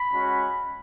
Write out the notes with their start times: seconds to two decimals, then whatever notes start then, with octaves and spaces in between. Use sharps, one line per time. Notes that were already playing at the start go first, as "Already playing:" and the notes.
Already playing: B5
0.12 G#3 C#4 F#4